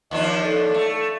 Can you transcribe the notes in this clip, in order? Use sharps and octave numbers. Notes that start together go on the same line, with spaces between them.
D#2 F3 D4 D#5
A4
A3